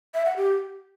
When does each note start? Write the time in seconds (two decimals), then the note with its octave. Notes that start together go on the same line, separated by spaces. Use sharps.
0.14 E5
0.25 F#5
0.37 G4